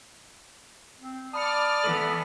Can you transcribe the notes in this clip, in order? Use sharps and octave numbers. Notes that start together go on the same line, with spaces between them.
C4
D5 A5 B5 D#6 F6 C#7
E3 B3 A4 D#6 D#7 F#7